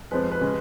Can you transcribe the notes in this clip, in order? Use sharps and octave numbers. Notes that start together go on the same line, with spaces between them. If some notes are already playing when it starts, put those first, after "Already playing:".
F2 F3 G#3 B4
B4
C#3 G#3